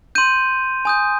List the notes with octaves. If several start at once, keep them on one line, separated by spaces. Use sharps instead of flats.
C6 G6 D#7
G#5 D#6 G6